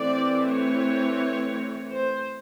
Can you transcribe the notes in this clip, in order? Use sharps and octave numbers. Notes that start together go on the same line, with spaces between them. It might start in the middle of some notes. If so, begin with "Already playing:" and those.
Already playing: E3 A3 C4 D5
C#5
C5